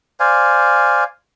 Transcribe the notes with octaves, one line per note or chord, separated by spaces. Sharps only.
C5 D5 F5 G#5